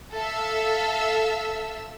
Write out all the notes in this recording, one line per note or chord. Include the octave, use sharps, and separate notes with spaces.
A4 E5 F5 E6